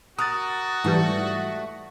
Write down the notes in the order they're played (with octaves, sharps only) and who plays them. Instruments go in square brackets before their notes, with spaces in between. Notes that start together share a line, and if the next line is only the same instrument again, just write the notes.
[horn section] F#4 [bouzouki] A#4 [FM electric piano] D#6 F#6 A6
[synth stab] G#2 E3 G3 [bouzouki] A3